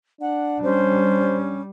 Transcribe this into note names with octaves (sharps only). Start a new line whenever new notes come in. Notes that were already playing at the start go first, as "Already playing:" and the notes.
D4 F#5
G3 C#4 C5